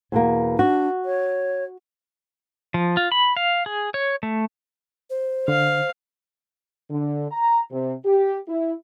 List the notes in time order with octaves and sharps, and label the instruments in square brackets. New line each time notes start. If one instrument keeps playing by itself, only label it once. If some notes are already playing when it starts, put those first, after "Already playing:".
[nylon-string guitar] E2 B2 A#3
[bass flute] D4 [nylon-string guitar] F#4
[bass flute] C#5
[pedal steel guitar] F3
F4
B5
F5
G#4
C#5
A3
[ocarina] C5
[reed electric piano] D3 [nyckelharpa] F5
[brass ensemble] D3
A#5
C3
G4
E4